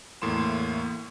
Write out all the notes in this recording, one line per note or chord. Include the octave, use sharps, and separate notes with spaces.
E2 A2 A#3 C6 E7